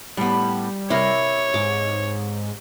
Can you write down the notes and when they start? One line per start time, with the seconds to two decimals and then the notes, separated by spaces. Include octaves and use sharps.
0.17 A2 G3 B3
0.90 C3 E4 A#4 C#5
1.54 G#2 D6